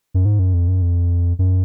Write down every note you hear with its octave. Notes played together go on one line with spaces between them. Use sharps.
F#2
G#2
F#2
F2
F#2
F2
F#2